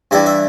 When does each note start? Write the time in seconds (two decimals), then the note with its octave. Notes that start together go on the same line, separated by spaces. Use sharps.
0.11 G2 E3 G3 E5
0.26 E5